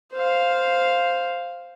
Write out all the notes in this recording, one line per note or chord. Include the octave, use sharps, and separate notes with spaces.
C5 F5